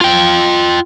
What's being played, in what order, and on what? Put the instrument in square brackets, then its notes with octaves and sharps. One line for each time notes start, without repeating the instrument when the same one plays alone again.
[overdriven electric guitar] F4 G5